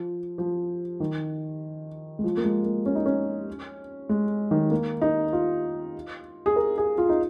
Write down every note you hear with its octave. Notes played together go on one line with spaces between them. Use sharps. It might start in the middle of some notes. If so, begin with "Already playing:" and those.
Already playing: F3
F3
D#3
G#3
F3
A#3
G#3
A#3
C#4
D#4
C#4
G#3
D#3
A#3
D#4
F4
G#4
A#4
G#4
F4
D#4